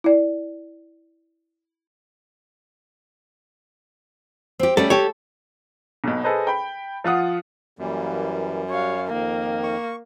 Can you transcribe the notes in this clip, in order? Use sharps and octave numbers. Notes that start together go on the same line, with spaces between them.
E4 D5
C4 G4
G3 A3 C#4 A4
G4 A4 C#5
B1 B2
G#4 A4 B4 C5 D#5
G5 B5
F3 F4 F#5 D#6
F#2 E3 G3 A#3
G3 F#4 C#5 F5
F2 D#3 A#3
C#6